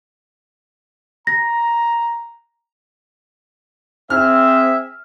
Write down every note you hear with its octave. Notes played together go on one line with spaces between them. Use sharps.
A#5 A#6
C4 G#4 E5 F6